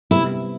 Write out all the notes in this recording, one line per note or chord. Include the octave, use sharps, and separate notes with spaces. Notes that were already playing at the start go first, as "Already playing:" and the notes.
C3 G3 B3 E4